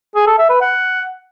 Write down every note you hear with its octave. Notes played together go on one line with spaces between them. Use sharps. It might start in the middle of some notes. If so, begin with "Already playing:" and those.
G#4
A4
E5
B4
F#5